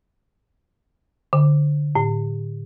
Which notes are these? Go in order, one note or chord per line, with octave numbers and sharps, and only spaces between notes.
D3
A2